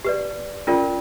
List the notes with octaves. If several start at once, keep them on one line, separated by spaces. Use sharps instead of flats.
G4 B4 D5
C#4 F4 A#4 D5